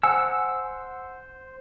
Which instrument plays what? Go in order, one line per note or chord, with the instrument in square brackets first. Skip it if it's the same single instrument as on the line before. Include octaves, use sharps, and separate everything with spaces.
[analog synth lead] C5 [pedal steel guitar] F#5 E6 [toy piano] G#5